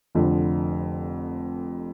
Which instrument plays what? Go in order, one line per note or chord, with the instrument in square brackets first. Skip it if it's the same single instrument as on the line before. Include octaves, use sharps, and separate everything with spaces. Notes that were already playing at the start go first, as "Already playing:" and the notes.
[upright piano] F1 F2 D3